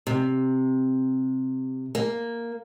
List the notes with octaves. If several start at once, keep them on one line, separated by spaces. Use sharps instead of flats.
C3
A#3